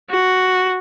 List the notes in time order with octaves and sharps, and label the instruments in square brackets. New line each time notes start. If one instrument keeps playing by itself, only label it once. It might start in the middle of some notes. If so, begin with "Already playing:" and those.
[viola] F#4